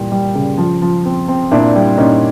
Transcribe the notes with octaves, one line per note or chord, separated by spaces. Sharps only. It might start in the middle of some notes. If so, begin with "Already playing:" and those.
Already playing: A#2 E3 G3
G3
C#3
F3
F3
C4
C4
A#2 D4 E4
G3
A#2 C#4 D#4